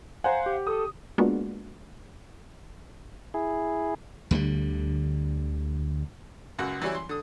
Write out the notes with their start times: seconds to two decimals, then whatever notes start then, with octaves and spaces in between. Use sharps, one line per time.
0.24 C5 F5 F#5 G#5 A#5
0.46 G4
0.67 A4 D#6
1.18 G#3 A#3 B3 D4 F4 F#4
3.34 E4 G#4
4.31 D2 D3 D#3 G3
6.59 C#2 F#2 F#4
6.82 E3 F#3 G3 C#4 E4
6.95 C6
7.09 D3 D#6